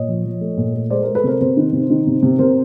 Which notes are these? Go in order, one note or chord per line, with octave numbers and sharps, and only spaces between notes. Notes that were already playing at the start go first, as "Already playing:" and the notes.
Already playing: A#2 C#5 D#5
F3
F3
A3
A#2
A3
G#3 C5 D5
G#3 A#4 C5
A4 B4
C3 A#4 C5
C3 A#4 C5
D#3
C3
D#3
C3
C3
C3 A#4 C5